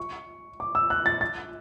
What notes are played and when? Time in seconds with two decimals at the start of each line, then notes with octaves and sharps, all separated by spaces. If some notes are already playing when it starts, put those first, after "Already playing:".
Already playing: C#6
0.60 D6
0.75 E6
0.90 F#6
1.06 A6
1.21 A6